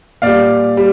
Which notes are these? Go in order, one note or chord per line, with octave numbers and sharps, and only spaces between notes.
A#2 G3 D5 F5
G3